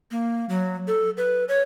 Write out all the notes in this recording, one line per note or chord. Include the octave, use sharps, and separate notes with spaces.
A#3
F#3
A4
B4
C#5